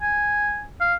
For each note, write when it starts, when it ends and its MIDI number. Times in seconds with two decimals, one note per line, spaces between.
0.02 0.64 80
0.81 0.95 77